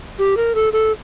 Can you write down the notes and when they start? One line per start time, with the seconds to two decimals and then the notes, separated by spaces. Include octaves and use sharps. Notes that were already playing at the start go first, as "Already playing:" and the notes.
0.19 G4
0.37 A#4
0.55 A4
0.73 A4